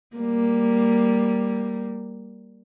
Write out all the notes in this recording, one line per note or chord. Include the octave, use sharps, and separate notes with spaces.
G3 A#3